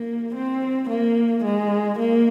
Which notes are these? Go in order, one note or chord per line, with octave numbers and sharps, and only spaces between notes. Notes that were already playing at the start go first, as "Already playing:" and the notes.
Already playing: A#3
C4
A#3
G#3
A#3